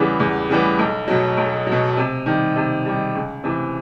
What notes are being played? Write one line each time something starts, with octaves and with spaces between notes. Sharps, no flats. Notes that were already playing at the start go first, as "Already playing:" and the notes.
Already playing: E2 C#3 E3 G3 B3
E2
C#3 E3 G3 B3
B1
B2 F#3
B1
B2 F#3
C3
D#3 G3
C3
D#3 G3
C#2
C3 E3